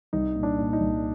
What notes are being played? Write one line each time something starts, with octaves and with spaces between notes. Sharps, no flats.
C2 D#4
A#2
D4
A#2
D#4
C2